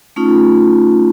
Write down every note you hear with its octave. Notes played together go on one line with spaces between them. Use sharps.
A3 C#4 D#4 F4